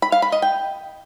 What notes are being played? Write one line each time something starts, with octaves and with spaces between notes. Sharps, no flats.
B5
F5
B5
D#5
G5